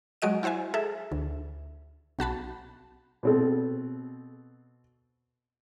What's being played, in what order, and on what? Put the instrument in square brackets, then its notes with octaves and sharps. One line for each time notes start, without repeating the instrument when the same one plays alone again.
[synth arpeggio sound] F#3 G#3 F#4 D#5 D7
E4 F#4 C5 E5 G#5
G#4 A4 E5
D2
B1 F#4 A5 B5
[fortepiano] B2 C4 A4